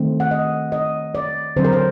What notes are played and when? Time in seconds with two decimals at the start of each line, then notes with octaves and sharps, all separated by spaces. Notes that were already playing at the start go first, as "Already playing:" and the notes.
Already playing: D#3 A3 C4
0.20 F#5
0.31 D#5
0.72 D#5
1.15 D5
1.56 D3 F#3 C4 C5
1.64 A#4
1.73 C5